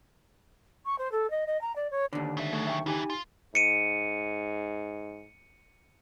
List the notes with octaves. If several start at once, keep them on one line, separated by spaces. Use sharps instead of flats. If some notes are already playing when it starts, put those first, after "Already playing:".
C#6
C5
A4
D#5
D#5
A#5
D5
C#5
D#2 D3
C#3 E5
F#3 A3 G#4
E5 G5 C#6
C#3 E3 D#4 G4 G#5
F4
G#2 C#7 D#7